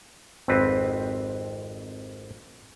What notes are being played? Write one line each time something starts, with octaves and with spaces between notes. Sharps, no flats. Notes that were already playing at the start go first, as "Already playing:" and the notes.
G#1 F2 C4 B4